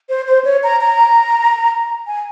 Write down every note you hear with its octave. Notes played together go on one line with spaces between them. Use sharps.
C5
C5
C#5
A#5
A#5
G#5